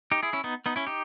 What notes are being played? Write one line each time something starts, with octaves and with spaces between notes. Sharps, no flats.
D#4 G4
E4 G#4
C#4 E4
B3 D#4
B3 D#4
C#4 E4
D#4 G4